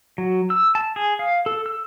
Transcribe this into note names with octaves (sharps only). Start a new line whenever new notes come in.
F#3
E6
A5
G#4
F5
A4
E6